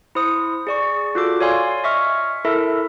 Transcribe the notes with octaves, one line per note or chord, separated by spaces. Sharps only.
E4 C5 D#6
G#4 D5 C#6
F4 F#4 A4 D6
C#5 D5 F5 G#5 C6
D#5 E5 C#6 F6
E4 A4 A#4 E5